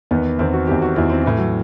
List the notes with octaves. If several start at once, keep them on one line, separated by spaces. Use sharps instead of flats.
E2 D#3 B3
E2 D#3 C4
F#4
E2 D#3 G4
F#4
E2 D#3 E4
C4
A2 E3
F#3